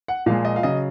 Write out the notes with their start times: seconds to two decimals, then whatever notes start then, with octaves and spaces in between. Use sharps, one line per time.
0.08 F#5
0.26 A#2 F3 G#3 F5
0.45 D#5
0.56 F5
0.63 C#3 F#3 D#5